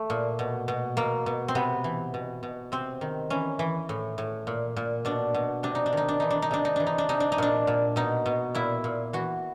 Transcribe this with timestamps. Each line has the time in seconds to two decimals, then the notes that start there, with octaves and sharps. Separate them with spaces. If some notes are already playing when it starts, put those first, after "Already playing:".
Already playing: A3
0.10 A#2
0.39 B2
0.68 B2
0.97 B2 A#3
1.26 B2
1.48 C4
1.55 C3 B3
1.84 E3
2.14 B2
2.43 B2
2.72 C3 C4
3.01 D#3
3.30 E3 C#4
3.59 E3
3.89 A2
4.18 A2
4.47 A#2
4.76 A#2
5.05 B2 D4
5.34 B2
5.63 C3 D4
5.75 D#4
5.86 D4
5.93 D#3 D#4
6.08 D4
6.20 E3 D#4
6.30 D4
6.42 D#4
6.51 C3 D4
6.65 D#4
6.76 E3 D4
6.87 D#4
6.98 D4
7.09 C3 D#4
7.20 D4
7.32 D#4
7.38 A#2 D4
7.67 A#2
7.96 B2 D#4
8.26 B2
8.55 A#2 E4
8.84 A#2
9.13 E3 F#4